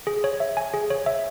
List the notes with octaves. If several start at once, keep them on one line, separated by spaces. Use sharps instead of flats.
G#4
C#5
E5
G#5
G#4
C#5
E5